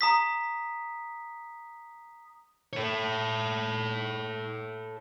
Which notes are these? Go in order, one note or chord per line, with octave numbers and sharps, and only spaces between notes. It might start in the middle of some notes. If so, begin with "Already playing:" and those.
A#5 D#6 B6
A4 C#5